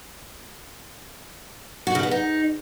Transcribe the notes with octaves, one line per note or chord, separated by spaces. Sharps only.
F#4
C#3
B3
D#4